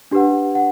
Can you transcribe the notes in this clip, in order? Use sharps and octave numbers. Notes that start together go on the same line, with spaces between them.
D4 G4 B4 F#5
F#5